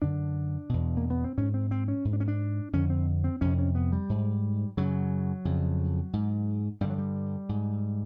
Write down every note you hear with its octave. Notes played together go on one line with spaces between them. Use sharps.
F#2 D3 D4
E2 B2
A#3
B3
C4
G#2 C#4
C4
C4
C#4
G#2
D4
C#4
D4
F2 D3 C#4
C4
C4
F2 C3 C#4
C#4
B3
G3
G#2
F#2 C#3 F#3
F2 C#3
G#2
G2 D3 G3
F#3
G3
G#2